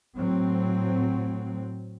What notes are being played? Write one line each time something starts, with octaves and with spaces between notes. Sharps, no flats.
A2 F#3 C4